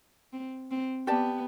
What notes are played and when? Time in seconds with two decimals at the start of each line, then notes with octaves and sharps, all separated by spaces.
0.33 C4
0.71 C4
1.07 B3 G4 D5 A5